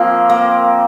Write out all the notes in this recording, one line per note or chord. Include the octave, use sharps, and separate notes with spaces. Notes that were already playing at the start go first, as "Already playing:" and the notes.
Already playing: F3 A#3 C4
A#3